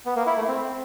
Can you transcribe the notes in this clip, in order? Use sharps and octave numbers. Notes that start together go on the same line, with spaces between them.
B3
A#3
E4
A3
C4